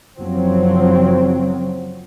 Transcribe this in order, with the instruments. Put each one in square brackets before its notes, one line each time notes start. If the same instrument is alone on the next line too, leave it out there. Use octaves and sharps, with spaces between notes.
[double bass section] F#1 F3 F#3 C4